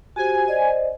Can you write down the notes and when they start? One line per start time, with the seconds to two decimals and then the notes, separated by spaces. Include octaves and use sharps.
0.16 F#4 G4 C5 G#5
0.48 C5 D5 D#5